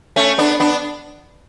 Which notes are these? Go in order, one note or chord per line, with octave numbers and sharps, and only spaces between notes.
A3 C#4
B3 D4
B3 D4